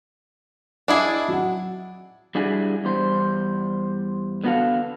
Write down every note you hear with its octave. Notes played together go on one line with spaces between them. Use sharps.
D4 E4 G#4 D#5 E5
F#3 F#5
G3 D4 E4 F#4 G#4
E2 G3 C5
D3 B3 F#4 A4 F5